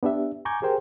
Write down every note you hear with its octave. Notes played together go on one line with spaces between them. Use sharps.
B3 D4 G4 E5
G#5 A#5 C#6 D6 G6 G#6
G4 G#4 A#4 C5 G5